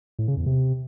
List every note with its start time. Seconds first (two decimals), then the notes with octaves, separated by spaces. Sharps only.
0.19 A2
0.28 C#3
0.37 E2
0.46 C3